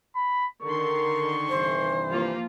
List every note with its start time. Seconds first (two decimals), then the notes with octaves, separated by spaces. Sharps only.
0.16 B5
0.63 D3 D#3 A#4 C6 C#6
1.49 G2 C3 E3 C5
2.10 F3 A#3 F4